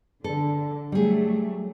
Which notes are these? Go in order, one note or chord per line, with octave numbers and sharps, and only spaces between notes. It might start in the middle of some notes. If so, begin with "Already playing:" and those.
D3 A4
F#3 G3 A3 G#4